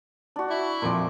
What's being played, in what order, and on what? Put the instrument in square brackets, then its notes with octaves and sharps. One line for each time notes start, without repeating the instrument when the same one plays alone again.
[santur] D4 F#4
[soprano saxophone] E4
[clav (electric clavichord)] F2 A#2 [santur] C6 D6